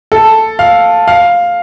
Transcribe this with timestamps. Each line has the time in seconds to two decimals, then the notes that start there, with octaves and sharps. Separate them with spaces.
0.12 A4
0.59 F5
1.08 F5